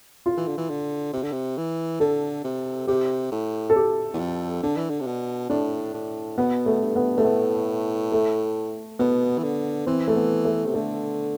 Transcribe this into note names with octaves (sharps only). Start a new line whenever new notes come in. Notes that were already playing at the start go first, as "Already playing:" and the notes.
F4
E3
D3
E3
D3
C3
D3
C3
E3
D3 A4
C3
C3 G4
A2
A4
G4
E2
F2
D3 D4
E3
D3
C3
B2
A2 D4
A2
B2 B3
A3
G2
B3
G2 A3
A2 B3
A3
B2 B3
E3
D3
E3 C4
A3
B3
A3
C3
D3 A3